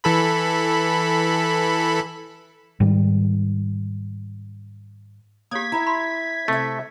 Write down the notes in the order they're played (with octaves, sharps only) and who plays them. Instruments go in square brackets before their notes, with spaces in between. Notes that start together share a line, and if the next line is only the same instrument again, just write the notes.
[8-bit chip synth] E3 A4 B5
[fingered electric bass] G#2 D#3 G3
[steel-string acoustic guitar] A#3 [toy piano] G4 C#5 D#6 [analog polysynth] G#6 B6
[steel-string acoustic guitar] E4 E5 [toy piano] A#5 B5
[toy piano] B5 C6
[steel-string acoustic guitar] C3 E5 [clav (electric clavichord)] A3